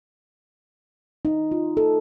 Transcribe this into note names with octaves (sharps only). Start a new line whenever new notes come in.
D#4
F4
A4